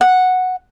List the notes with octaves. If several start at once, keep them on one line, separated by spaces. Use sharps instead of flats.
F#5